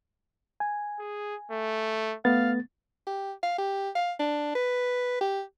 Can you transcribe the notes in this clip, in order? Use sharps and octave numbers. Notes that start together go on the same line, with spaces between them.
G#5
G#4
A3
A3 B3 F5 A6
G4
F5
G4
F5
D4
B4
G4